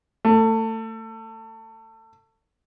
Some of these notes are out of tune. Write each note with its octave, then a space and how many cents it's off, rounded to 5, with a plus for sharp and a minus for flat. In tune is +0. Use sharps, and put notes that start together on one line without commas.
A3 +25